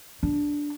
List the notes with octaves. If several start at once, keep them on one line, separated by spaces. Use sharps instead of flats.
D4